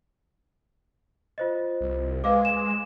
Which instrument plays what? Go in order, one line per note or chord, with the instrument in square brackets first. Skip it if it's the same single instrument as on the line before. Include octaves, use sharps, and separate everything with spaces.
[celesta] F4 C5 D#5
[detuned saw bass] C2
[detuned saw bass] G#3 [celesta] B4 F5 D6
[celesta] E7